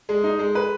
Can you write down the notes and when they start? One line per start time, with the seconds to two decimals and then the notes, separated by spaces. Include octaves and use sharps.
0.09 G#3
0.24 D#4
0.39 G#3
0.55 B4